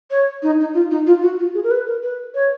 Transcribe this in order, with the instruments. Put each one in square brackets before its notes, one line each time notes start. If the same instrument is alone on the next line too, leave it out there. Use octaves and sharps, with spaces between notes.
[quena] C#5
D#4
D#4
F4
D#4
F4
F#4
F4
G#4
A#4
B4
A#4
B4
C#5